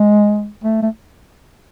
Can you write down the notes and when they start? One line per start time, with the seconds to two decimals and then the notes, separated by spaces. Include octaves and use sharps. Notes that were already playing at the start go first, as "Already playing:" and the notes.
Already playing: G#3
0.64 A3
0.82 A3